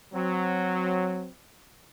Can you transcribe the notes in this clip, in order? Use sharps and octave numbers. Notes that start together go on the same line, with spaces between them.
F#3 C4